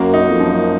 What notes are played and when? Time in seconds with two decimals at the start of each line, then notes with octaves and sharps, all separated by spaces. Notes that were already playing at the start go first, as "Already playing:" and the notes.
Already playing: F#2 A#3 F#4
0.14 D#4
0.29 F2
0.40 F#2 F3